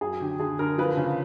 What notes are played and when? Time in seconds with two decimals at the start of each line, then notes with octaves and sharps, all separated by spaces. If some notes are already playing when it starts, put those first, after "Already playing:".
0.01 F#2 G#4
0.20 D3 G4
0.39 D3 G#4
0.59 D3 A#4
0.78 F3 B4
0.97 C#3